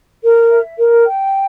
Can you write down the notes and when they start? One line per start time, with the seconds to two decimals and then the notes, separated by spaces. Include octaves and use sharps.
0.21 A#4
0.49 E5
0.77 A#4
1.05 G5